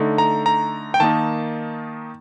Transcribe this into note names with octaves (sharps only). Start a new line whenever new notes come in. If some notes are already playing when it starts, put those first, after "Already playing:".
Already playing: D3 A3 D#4
A#5
A#5
G5
D#3 A#3 D#4 A5